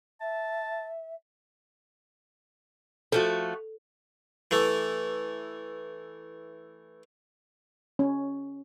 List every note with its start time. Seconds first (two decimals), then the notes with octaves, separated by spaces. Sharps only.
0.21 E5 A5
3.12 F3 A3 F#4 A4
4.51 E3 A3
7.99 C#4